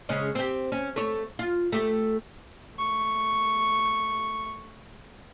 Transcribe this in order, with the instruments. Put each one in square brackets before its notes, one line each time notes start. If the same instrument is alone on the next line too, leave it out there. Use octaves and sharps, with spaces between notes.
[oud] C#3 G#3 C#4
C4 G4
C#4
A3 C#5
F4
A3 G4
[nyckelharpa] A3 C#6